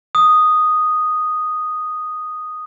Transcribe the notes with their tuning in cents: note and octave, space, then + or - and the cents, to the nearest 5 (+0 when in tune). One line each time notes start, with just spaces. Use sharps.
D#6 -5